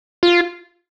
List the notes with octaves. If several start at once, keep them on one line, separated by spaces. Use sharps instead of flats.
F4